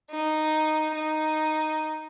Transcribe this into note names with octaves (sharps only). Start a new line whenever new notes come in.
D#4
D#4